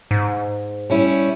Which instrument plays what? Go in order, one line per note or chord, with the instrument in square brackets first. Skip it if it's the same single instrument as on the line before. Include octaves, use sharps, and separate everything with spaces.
[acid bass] G#2
[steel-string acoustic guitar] G3 C#4 E4